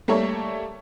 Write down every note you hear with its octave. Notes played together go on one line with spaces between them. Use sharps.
G3 A3 A#3 A4 C#5 E5